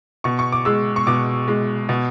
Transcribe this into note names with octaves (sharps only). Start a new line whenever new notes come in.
B2 C#6
C#6
D6
G#3 E6
C#6
B2 D6
G#3
B2